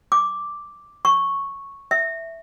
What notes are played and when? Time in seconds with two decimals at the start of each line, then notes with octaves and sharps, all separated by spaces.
0.12 D6
1.05 C#6
1.91 E5